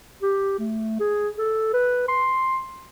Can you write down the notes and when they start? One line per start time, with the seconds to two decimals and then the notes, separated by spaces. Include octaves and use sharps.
0.23 G4
0.59 A3
1.00 G#4
1.39 A4
1.74 B4
2.08 C6